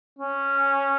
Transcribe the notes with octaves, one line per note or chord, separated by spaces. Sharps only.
C#4